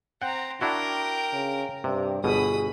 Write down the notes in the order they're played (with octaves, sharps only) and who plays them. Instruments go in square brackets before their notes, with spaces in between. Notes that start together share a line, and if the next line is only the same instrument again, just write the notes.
[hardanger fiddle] C4 A#5 [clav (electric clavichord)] F#5 G5
[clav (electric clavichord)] D4 E4 F#4 [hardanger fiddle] A#4 G5
[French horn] C#3
[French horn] G2 [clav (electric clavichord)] C3
[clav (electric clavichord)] G1 B2 [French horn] G#4 [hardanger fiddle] B5 D#6